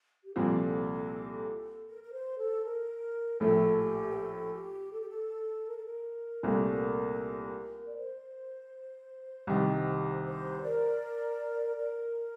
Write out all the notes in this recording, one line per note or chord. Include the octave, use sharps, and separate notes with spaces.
G4
C2 A#2 F3 C4 A4
A#4
A#4
C5
A4
A#4
A#1 A2 A3 A4
G4
A#4
A4
G4
A4
G4
A4
A#4
A4
A#4
C2 A#2 A3 C4
D5
C5
C2 C3 D#3
C5
A#4 D5
A#4